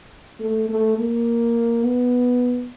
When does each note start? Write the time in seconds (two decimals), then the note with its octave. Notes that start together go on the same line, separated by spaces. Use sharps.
0.40 A3
0.69 A3
0.97 A#3
1.83 B3